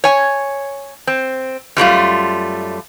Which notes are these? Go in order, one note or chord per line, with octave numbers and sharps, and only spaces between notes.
C#5 G#5
C4
F#2 G3 A3 F4